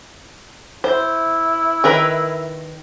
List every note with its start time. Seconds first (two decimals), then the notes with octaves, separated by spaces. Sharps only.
0.84 E4 C5
1.84 D#3 A#4 B4